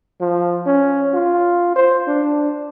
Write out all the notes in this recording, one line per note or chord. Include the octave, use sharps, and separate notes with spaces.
F3
C#4
F4
C5
D4